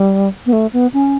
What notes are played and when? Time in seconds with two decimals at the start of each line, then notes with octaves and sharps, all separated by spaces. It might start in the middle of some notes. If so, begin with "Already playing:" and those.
Already playing: G3
0.46 B3
0.53 A3
0.73 B3
0.93 C#4